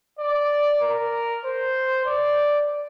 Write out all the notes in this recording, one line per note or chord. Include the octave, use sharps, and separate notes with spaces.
D5
A#4
C5
D5